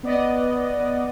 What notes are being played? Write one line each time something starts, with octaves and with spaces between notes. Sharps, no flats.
B3 D5 D#5